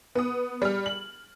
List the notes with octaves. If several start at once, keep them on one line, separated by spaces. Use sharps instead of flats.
B3 D#6
G3 F6
F#7